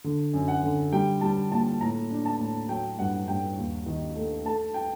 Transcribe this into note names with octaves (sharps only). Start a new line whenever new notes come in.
D3
F#2
F#5
D3
G3 G5
G3 A5
A#2 A5
A2 A#5
D4
A5
A2
F#3 G5
G2 F#5
G2 G5
D#2
D#3
A3
A3 A5
G5